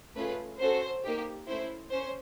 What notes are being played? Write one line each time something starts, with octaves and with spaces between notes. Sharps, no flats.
A3 C#4 F4 G#4 B4
C#4 F#4 A4 C5
A#3 D#4 G4
A3 C#4 E4 C5
C#4 C5